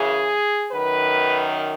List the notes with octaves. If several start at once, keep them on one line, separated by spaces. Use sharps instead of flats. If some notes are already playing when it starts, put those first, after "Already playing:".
Already playing: F#2 C#3 E3 G#4
F#2 D#3 B4